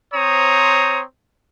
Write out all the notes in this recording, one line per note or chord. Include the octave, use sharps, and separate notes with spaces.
C4 C5 C#5 A#5 D#6